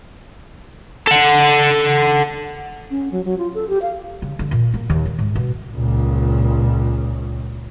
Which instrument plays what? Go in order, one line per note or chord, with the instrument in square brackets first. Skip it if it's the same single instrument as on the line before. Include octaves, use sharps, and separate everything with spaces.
[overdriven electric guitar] A4 F#5
[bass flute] C#4
F#3
F#3
F4
A4
G4
F5
[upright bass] C#3
D3
A#2
A#3
D#2
D#3
G#2
B2
[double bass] C#2 A#2